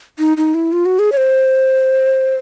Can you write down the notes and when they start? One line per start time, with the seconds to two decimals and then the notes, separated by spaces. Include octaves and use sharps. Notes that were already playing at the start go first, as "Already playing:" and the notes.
0.19 D#4
0.37 D#4
0.54 E4
0.73 F4
0.86 F#4
0.99 G#4
1.12 C#5
1.17 C5